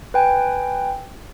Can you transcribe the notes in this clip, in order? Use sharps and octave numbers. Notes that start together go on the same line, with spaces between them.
B4 G5 G#5